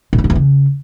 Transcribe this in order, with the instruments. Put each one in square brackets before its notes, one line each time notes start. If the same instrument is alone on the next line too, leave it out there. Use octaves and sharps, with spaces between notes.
[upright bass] A#2
D#3
A2
E2
C#3